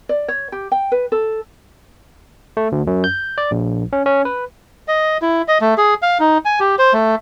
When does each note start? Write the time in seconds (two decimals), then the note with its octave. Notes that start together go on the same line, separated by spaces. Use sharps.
0.09 D5
0.28 C#5
0.52 G4
0.72 G5
0.92 B4
1.12 A4
2.57 A3
2.72 D2
2.87 F#2
3.04 G6
3.38 D5
3.51 A#1
3.93 C#4
4.06 C#4
4.25 B4
4.88 D#5
5.22 E4
5.48 D#5
5.61 A3
5.78 G#4
6.02 F5
6.20 D#4
6.45 G#5
6.60 G4
6.78 C5
6.93 A3